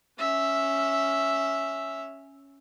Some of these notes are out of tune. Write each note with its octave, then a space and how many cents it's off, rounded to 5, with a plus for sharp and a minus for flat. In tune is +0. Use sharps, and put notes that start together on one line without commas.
C#4 +0 E5 +0